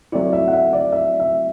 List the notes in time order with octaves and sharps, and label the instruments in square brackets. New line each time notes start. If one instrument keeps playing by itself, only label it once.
[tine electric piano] F#3 A3 C4 E4 [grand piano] D5
[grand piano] E5
F#5
E5
D5
E5
E5